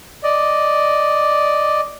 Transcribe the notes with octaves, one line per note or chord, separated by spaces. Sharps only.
D5 D#5